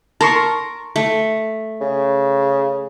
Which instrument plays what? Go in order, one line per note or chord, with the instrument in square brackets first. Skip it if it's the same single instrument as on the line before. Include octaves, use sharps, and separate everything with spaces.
[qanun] A#4 [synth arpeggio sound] A5 C6 C#6
[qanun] A3
[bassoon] C#3